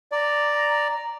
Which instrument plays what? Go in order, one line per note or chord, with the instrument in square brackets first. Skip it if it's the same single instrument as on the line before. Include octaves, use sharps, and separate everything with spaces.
[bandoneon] D5 [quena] A#5